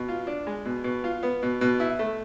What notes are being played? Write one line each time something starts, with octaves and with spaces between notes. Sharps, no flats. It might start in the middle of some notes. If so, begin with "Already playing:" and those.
Already playing: B2
F4
D4
G#3
B2
B2
F4
B3
B2
B2
E4
A3